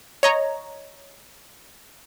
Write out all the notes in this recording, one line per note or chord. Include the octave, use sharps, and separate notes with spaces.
C#5 D#5 A#5